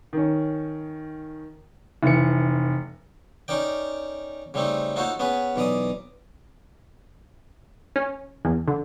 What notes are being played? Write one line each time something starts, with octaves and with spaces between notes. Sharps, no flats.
D#3 C#4
F1 E3 C#7
C#4 D#4 A#4 D5 G5
C#3 G3 A3 C4 D#4
D#4 F4 F#4 A4 C5 C#5
B3 C#4 G#4 B4
B1 E3 D5 A#5 D#6
C#4
E2
D3